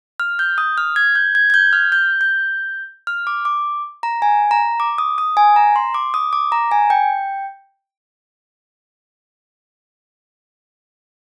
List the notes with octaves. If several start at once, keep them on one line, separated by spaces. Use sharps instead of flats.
F6
G6
D#6
F6
G#6
G6
G#6
G#6
G6
F6
G6
G6
F6
D6
D6
A#5
G#5
A#5
D6
D#6
D#6
G#5
A#5
C6
D6
D#6
D6
A#5
G#5
G5